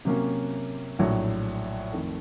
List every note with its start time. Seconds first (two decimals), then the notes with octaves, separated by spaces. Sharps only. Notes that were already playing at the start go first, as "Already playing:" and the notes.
0.05 C3 F#3 A#3 C#4
0.99 A#1 A2 F#3
1.92 F2 D#3 A3